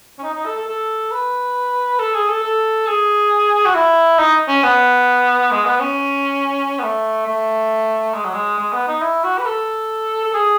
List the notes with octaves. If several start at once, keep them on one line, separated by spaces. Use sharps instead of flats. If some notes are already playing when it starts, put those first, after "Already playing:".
C#4
D#4
D#4
A4
A4
A4
B4
A4
G#4
A4
A4
G#4
F#4
E4
D#4
C#4
B3
G#3
B3
C#4
B3
A3
A3
G#3
F#3
G#3
G#3
B3
D#4
E4
F#4
B4
A4
A4
G#4